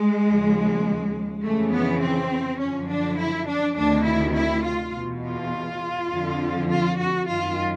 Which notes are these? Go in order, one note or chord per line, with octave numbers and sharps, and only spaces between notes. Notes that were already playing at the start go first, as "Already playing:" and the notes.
Already playing: G#3
D#2 C#3 F3
F2 C#3 E3 A3
B3
C4
F#2 D3 F3 C#4
D4
E4
D4
D2 C3 D#3 D4
E4
E4
F4
E2 B2
F4
F2 D3 F3
F4
F#4
F#2 D#3 F4